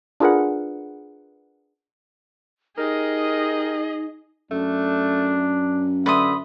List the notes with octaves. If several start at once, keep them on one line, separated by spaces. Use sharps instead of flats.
D4 F4 G#4 A#4 B4 F#5
D#4 G4 G#4 A#4 D#5
F#2 A3 D4
D3 B4 E5 C6 D#6